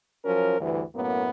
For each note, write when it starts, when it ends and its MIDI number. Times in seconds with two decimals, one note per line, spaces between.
0.24 0.57 53
0.24 0.57 54
0.24 0.57 61
0.24 0.57 70
0.60 0.81 38
0.60 0.81 43
0.60 0.81 52
0.95 1.30 42
0.95 1.30 45
0.95 1.30 58
0.95 1.30 59